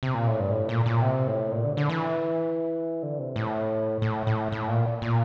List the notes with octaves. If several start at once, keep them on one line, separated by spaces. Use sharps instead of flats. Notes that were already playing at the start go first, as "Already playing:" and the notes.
C3
A#2
A2
G2
A2
A#2
A#2
C3
A2
A#2
D3
D3
E3
D3
C3
A2
A2
A2
A2
A#2
A#2